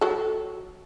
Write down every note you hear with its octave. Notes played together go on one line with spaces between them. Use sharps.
F#3 A4